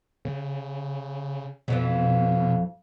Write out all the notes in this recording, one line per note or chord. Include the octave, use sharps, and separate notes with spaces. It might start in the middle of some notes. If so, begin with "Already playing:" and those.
C#3
F2 B2 E3 F3